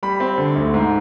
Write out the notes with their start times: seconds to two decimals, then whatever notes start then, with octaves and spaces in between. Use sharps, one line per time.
0.03 G3 B5
0.20 C4
0.38 D3
0.56 D2
0.74 G#2